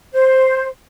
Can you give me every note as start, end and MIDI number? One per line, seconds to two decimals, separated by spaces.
0.13 0.66 72